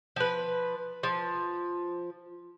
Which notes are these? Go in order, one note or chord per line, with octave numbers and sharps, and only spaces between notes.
F3 B4
F3